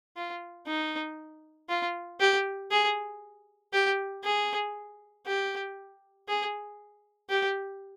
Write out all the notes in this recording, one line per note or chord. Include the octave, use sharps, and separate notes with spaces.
F4
D#4
F4
G4
G#4
G4
G#4
G4
G#4
G4